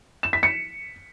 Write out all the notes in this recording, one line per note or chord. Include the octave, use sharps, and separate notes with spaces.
E7
B6
C#7